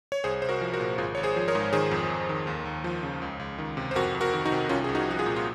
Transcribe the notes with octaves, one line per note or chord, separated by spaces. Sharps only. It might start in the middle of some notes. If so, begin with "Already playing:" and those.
C#5
C2 G#4 C5
C2 C5
F#4 A#4
F3
F#4 A#4
A#2
G#1 F4 G#4
G#1 C#5
G#4 C5
F3
A#4 C#5
G#2
D#3 G#4 C5
F2
F2
D#3
D#2
D#2
F3
C#3
C#2
C#2
D#3
C3
C5
F2 F#4 A#4
F2
F#4 A#4
D#3
D#4 F#4
C3
C2 C#4 F4
C2 G#4
D#4 F#4
F3 F#4
F4 G#4
A#2
F4